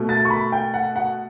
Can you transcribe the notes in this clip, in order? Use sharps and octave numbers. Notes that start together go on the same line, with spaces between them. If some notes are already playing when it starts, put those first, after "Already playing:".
Already playing: B2 A3
A6
C#6
B5
G5
F#5
F#5